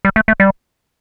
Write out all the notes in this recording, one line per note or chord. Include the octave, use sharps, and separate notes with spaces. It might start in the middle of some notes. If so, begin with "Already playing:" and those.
G3
A3
A3
G3